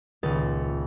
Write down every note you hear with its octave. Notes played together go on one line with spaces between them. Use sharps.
D#1 C#2 D#6 A6